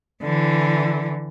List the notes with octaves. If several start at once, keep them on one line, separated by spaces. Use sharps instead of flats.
D3 E3